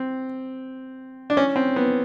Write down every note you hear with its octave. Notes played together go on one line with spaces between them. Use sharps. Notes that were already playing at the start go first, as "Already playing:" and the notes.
Already playing: C4
D4
C#4
C4
B3